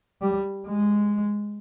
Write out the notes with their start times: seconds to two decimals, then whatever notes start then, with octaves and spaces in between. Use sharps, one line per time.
0.21 G3
0.66 G#3